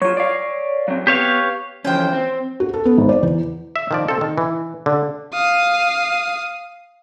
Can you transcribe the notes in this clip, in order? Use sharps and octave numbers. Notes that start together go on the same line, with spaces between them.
F#3 F4 C#5
D5 F5
F#3 C4
B3 G4 C#5 F5
E3 F3 C#4 C5 G5
C4
F#4
A4
B3
G#1
D5
E2
E5
D#3 F3 D5
C4 A4
D#3
E3
D3
F5 D#6